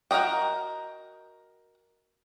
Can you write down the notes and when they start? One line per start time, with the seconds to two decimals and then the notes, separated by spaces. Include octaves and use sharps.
0.11 F#4 A#4 B4 D#5 G5